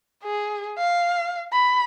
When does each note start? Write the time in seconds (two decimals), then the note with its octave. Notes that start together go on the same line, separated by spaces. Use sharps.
0.24 G#4
0.78 F5
1.52 B5